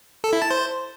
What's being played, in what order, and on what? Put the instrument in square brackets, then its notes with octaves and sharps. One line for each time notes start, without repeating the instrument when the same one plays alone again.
[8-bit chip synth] A4
E4
A5
C5